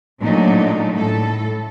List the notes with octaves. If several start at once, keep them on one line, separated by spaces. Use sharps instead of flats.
A#2 C#3 F#3 A3 D4 D#4
A2 A4